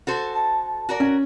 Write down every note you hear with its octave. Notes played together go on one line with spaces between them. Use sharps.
F#4 A4 C5
A5
F#4 A#4 D5
C#4